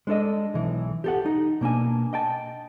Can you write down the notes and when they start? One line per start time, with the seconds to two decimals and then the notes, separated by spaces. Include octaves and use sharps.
0.07 G#3 D4 A4 D#5
0.54 B1 E3
1.04 G4 A4 F#5
1.25 D#4
1.61 B2 A#3 D4 G#5
2.13 D#5 G5 A5